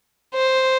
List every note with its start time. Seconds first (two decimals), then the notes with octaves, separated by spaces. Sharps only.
0.34 C5